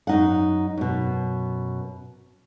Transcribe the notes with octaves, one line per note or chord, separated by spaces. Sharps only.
F#2 D#4 F#5
F#2 B2